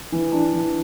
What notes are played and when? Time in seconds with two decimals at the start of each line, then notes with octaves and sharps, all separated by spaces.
0.12 E3
0.32 D4
0.53 E3